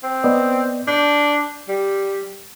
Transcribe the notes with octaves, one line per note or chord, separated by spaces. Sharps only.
C4
B3 D5 D#5
D4 G6
G3